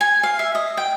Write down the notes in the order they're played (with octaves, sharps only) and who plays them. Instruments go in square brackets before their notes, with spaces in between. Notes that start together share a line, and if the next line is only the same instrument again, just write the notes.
[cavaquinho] G#5
F5
E5
D#5
G5